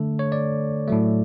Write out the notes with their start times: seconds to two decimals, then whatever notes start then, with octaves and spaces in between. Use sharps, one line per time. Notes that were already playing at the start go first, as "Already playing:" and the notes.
Already playing: D3 A3 A4
0.19 C#5
0.32 D5
0.88 A2 F#3 A3